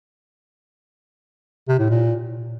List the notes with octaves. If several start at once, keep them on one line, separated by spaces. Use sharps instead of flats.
C3
A2
A#2